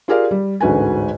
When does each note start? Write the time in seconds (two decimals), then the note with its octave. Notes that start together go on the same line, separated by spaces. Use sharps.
0.08 F4 G4 G#4 A#4 D5 F5
0.31 G3
0.60 A1 D2 G#2 F#4 B4 G#5